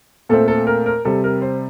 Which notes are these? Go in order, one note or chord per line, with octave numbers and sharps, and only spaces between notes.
A#2 A3 C4 A4
A4
A#4
A#4
C3 G3 C4 A4
A#4
C5